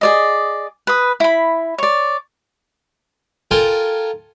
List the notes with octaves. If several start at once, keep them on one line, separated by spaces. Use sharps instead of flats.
G#4 D5 D#5
B4 D#6
E4 B5
C#5 D5
F4 A4 A#4 G5 G#5